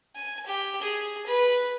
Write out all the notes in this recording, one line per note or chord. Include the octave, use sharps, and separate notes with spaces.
G#5
G4
G#4
B4